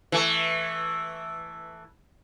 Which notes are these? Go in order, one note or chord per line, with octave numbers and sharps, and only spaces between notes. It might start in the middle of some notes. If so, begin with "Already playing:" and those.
E3 A3